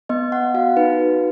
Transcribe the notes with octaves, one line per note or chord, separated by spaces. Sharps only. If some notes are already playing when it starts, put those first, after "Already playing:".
B3 D#5
B3 F#5
F#4 F5
D#4 B4
F#4